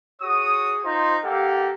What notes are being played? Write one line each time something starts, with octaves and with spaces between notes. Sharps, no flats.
F#4 G#4 C#5 D#6
D#4 F4 C5
A#3 G4 A4 F5 F#5